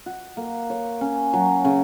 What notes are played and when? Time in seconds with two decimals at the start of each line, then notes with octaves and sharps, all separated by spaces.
0.06 F#4
0.37 A#3
0.70 C#5
1.01 C#4
1.33 F#3
1.65 C#3